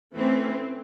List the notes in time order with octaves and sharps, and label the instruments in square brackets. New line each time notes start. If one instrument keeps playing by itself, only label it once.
[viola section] E3 A3 C#4 [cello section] C4